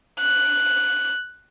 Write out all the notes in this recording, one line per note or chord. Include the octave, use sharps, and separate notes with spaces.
F#6